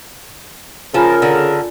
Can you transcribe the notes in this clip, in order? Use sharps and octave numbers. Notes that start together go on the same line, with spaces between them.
C#3 F3 F4 G#4 A#4 G#5 B5
D3